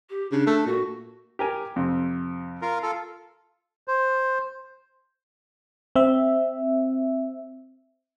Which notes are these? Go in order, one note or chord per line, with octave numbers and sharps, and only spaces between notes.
G4
C#3 D4
A3
A#2 F#4
G4 A#4 G#5
F2 C3
F4 A#4
F4 A4
C5
C4 E5